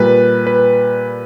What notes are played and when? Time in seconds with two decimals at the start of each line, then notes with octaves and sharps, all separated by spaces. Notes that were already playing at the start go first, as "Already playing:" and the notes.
Already playing: A#2 G3 B4
0.47 B4